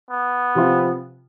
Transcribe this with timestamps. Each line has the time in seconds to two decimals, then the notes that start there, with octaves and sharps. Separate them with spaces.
0.11 B3
0.55 C3 F3 C4 F4